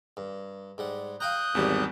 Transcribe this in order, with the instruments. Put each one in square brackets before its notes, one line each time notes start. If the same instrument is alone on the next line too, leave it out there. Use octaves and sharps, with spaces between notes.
[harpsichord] G2
G#2 G3 F#5
[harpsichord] F5 G5 A#5 [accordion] D#6 F#6 G6
[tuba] G#1 [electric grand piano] E2 G3 G4